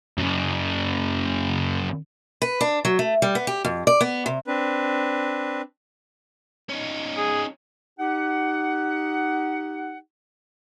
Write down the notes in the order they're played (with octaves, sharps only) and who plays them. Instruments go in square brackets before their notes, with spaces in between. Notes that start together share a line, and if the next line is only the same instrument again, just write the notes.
[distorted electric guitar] F#2 C#3
[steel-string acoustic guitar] B4
D4
F#3
A3
G3
B3
G4
F2
D5
B3
C3
[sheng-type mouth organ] C4 D4 B4
[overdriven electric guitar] C#4 D#4
[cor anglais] G#4
[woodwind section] D#4 G4 F#5